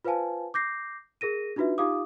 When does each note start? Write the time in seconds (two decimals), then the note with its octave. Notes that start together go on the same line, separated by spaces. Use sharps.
0.05 F4 B4 C5 F5 G#5 A5
0.54 D6 G6 A#6 C7
1.21 G#4 A#4 A#6 D#7
1.56 D4 D#4 F4 F#4 B4 E5
1.78 D#4 F4 G4 F5 D6 D#6